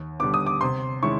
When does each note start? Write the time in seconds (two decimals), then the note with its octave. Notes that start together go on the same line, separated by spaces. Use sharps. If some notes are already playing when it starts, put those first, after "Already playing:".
Already playing: D#2
0.19 D3 G3 B3 D6
0.34 D#6
0.47 D6
0.61 C3 C6
1.02 D#3 G#3 C#4 E4 C#6